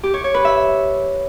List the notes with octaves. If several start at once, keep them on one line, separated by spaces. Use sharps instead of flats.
G4
C#5
C#5
B4
E5